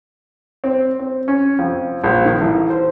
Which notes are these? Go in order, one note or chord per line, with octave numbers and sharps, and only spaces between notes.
C4
C4
C#4
F2
A#1
D#3
A1
C5